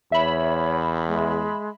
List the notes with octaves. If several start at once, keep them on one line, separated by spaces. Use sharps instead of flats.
E2 C#5 E5 B5
G#3